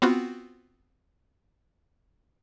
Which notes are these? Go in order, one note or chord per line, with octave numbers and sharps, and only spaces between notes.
B3 C4 F4 F#4